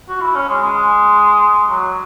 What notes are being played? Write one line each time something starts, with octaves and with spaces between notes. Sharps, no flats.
F#4
E4
C#4
G#3
G#3
F#3